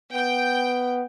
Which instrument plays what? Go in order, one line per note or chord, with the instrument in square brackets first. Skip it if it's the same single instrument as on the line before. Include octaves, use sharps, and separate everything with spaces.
[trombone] B3 [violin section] G5